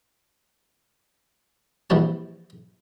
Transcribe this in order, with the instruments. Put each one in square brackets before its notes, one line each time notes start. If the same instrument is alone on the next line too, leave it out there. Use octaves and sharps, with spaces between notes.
[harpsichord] A#1 C3 E3 G3 F#4 A5